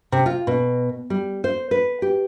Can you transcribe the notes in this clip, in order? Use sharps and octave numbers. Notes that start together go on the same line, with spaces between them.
C3
F4
B2
G3
C5
B4
G4